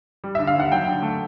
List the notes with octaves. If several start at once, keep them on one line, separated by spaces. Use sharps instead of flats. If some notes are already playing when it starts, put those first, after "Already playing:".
G3
D3 E5
F5
D#2 F#5
F#3 G5
D3
A3